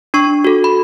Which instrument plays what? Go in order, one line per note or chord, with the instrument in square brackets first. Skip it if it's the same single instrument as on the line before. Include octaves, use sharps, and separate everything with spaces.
[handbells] D4 C#6
F#4 A4
B5